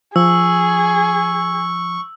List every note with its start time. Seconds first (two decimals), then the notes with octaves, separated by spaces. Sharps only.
0.16 F3 G#4 C#6 E6